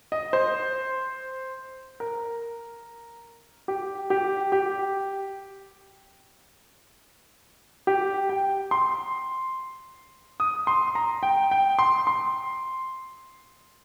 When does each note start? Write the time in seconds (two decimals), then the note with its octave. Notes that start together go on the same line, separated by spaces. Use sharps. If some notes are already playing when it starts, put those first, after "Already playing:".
0.12 D#5
0.33 C5
2.00 A#4
3.68 G4
4.10 G4
4.52 G4
7.87 G4
8.29 G5
8.71 C6
10.40 D#6
10.67 C6
10.95 A#5
11.23 G5
11.51 G5
11.79 C6
12.07 C6